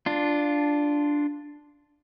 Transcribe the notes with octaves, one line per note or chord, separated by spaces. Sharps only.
D4 F4